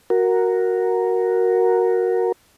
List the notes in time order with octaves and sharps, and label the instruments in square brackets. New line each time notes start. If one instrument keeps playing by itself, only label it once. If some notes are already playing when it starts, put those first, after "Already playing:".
[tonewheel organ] F#4 A#4